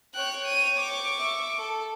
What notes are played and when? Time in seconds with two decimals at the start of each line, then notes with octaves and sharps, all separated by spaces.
0.15 C#5 G5 F#6
0.46 D#7
0.78 C#6 D6
1.18 E5
1.58 A4